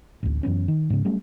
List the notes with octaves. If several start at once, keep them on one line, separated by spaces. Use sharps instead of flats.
A1 D2
F#2 E3 B3 C#4
D#3
G#2 C#3
F#3 G3 A3 C#4